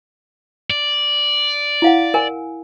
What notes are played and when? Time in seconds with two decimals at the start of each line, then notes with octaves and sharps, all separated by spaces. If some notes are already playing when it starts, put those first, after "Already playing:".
0.70 D5
1.82 E4 F5 F#5
2.14 A#4 G#5